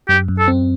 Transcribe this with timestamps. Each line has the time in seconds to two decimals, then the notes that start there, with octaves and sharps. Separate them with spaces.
0.09 F#2 G4
0.28 F#2
0.39 A4
0.48 C4